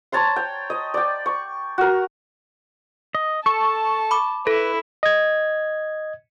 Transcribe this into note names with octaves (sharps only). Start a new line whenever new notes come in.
C#5 A5 A#5 C6
G5
D#5
D5 G5
C#6
F#4 A#4
D#5
A4 A5 C#6
B5 D6
E4 A4 B4
D#5 G#6